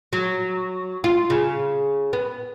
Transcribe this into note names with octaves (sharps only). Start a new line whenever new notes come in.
F#3
F4
C#3
B3